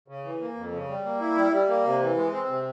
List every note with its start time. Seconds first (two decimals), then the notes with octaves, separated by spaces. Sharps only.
0.08 C#3
0.24 E3
0.41 A#3
0.56 F2
0.72 C#3
0.88 G3
1.05 A#3
1.20 E4
1.36 G3
1.52 G3
1.68 A#3
1.84 C3
2.01 E3
2.16 G#3
2.32 C4
2.48 C3